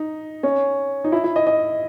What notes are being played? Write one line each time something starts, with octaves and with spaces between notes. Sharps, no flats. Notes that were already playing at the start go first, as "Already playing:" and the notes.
Already playing: D#4
C#4
D#4
E4
E4
D#5
D#5